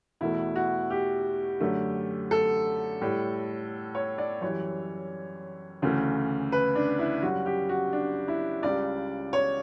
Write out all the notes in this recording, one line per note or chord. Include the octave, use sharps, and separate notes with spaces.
E2 B2 A3 E4
F#4
G4
F#2 D3 A3
A4
A2 G3
C#5
D5
F#2 E3 G3 C#5
D2 C#3 E3 A3
B4
D4
E4
F#2 C#3 G3 F#4
G4
F#4
D4
E4
C#2 C#3 G3 D5
C#5